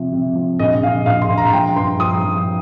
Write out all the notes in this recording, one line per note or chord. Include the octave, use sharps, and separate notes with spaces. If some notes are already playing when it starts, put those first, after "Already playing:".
Already playing: C3 F3
C3
F3
A#1 D#5
A#1 F5
A#1 F5
C6
A#1
A#5
F3 G5
G2 C6
F3 D#6
F3